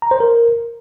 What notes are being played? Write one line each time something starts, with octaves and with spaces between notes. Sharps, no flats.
A#5
C5
A#4